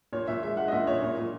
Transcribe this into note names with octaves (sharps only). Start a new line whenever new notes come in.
A#2 C#5
A#2 E5
G#3 E5
G#3 F#5
D#5
A#2 E5
A#2 C#5
A#2
A#2